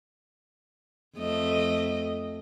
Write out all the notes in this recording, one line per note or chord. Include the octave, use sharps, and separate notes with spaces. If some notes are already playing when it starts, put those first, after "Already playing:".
F2 A3 D#5